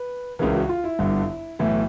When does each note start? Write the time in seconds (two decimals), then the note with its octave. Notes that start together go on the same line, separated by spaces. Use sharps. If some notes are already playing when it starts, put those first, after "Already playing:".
Already playing: B4
0.39 C#2 C#3 E3 A#4
0.54 F#4
0.69 F4
0.84 E4
0.99 G1 G2 D3
1.59 B1 A2 E3 E4